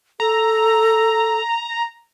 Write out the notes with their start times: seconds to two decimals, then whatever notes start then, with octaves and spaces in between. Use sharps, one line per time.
0.20 A4 A#5